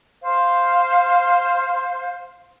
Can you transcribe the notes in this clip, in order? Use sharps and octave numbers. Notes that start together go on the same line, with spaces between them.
C5 F5